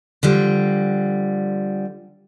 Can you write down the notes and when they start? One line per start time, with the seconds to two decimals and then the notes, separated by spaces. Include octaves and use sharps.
0.23 D3 F3 G3